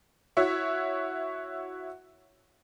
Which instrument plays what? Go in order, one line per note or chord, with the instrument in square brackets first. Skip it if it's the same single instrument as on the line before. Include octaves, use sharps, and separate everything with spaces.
[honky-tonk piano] E4 F#4 C#5 E5